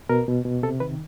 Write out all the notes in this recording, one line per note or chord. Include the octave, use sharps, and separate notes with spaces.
B2 A#4
B2
B2
C3 A4
D#3 B4